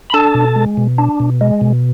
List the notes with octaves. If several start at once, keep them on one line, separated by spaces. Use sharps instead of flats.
B5
D4 A4 A5
B2
G#3
B2
D4
B2
G#3
B2